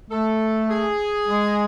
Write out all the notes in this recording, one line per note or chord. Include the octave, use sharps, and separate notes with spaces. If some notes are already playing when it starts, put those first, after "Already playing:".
A3 A4
G#4
G#3